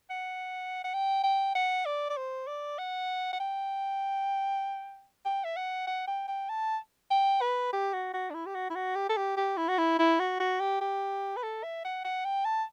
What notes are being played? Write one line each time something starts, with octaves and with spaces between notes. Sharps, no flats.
F#5
F#5
G5
G5
F#5
D5
D5
C5
D5
F#5
F#5
G5
G5
E5
F#5
F#5
G5
G5
A5
G5
B4
G4
F#4
F#4
D4
E4
G4
F#4
E4
F#4
G4
A4
G4
G4
E4
F#4
E4
E4
F#4
F#4
G4
G4
B4
A4
E5
F#5
F#5
G5
A5